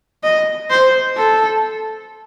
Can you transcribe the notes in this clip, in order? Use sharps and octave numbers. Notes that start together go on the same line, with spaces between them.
D#5
C5
A4